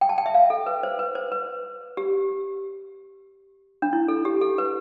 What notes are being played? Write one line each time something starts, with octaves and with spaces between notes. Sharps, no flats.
G5
A5
G5
E5
F5
A4
B4
C5
B4
C5
B4
G4
D4
E4
A4
G4
A4
B4